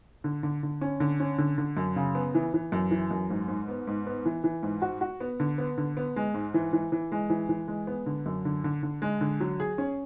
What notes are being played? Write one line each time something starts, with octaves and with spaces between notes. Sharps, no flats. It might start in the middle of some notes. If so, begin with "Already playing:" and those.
D3
D3
D3
C#4
D3
C#4
D3
D3
F#2
C#3
B3
E3
E3
F#2
E3
F#2
G#2
G#2
B3
G#2
B3
E3
E3
G#2
F#4
F#4
B3
D3
B3
D3
B3
G#3
G#2
E3
E3
E3
G#3
E3
E3
G#3
B3
D3
F#2
D3
D3
D3
G#3
D3
F#3
G#4
C#4